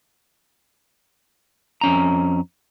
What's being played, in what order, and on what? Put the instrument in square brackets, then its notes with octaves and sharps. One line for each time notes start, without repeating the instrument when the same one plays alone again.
[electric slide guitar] F2 C#4 A#5